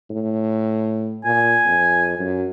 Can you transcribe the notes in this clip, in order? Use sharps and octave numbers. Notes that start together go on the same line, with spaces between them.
A2
A#2 G#5
F2
F#2